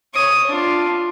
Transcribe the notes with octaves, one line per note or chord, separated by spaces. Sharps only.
C#5 D#6
D4 F4